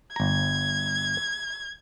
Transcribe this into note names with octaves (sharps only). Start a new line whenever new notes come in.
G1 A#5 G#6